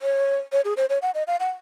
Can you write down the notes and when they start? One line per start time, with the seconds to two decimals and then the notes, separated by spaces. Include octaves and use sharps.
0.02 C#5
0.52 C#5
0.65 G#4
0.77 C5
0.89 C#5
1.02 F#5
1.14 D#5
1.27 F5
1.40 F#5